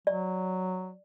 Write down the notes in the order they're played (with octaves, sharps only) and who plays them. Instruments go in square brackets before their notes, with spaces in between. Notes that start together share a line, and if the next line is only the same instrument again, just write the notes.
[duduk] F#3 [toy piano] D5